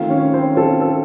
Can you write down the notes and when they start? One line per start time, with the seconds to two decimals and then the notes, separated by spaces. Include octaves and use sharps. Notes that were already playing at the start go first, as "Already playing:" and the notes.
Already playing: D#3 A3 C4 F4 F5
0.10 C#4 C#5
0.34 C4 C5
0.57 A4
0.81 A4